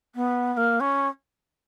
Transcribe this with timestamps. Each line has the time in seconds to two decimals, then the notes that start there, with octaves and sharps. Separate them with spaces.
0.15 B3
0.53 B3
0.57 A#3
0.80 C#4